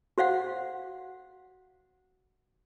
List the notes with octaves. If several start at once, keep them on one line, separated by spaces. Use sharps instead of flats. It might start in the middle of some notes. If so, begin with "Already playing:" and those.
F#4 C5 F5 F#5